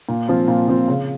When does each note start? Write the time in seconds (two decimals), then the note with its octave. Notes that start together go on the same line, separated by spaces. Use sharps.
0.09 A#2
0.28 F3 C4 F4
0.48 A#2
0.68 F3 C4 F4
0.88 C#3